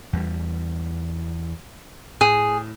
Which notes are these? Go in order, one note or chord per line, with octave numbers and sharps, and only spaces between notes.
E2 G3
A2 G#4